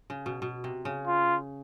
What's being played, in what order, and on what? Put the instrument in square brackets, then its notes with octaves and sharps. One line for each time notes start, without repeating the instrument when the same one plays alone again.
[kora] C#3
B2
B2
C3
C#3
[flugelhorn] F4